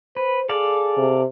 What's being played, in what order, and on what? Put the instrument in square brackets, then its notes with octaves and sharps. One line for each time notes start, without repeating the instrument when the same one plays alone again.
[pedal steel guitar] B4 [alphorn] C5
[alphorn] G#4 [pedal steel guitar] A4 D5 F5
[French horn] C3